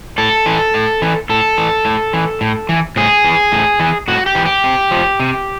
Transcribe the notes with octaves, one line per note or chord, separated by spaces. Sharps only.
A2 A4
E3
A2
E3
A2 A4
E3
A2
E3
A2
E3
A2 G#4
E3
A2
E3
A2 F#4
G4
E3
G4
C3
F3
C3